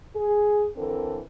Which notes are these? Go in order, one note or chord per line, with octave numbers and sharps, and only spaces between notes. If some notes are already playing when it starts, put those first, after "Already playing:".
G#4
D3 E3 C4 A4 A#4